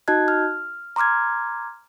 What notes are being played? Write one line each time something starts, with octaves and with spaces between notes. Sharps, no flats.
D#4 F#4 D#5 A5 F#6 G#6
F6
A#5 C6 D6 F6 G#6